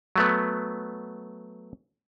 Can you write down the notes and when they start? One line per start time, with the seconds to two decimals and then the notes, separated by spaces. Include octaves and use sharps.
0.16 F#3 A3 B3